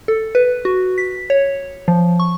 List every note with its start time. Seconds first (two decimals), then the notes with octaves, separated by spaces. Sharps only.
0.08 A4
0.35 B4
0.65 F#4
0.98 B6
1.30 C#5
1.88 F3
2.20 C#6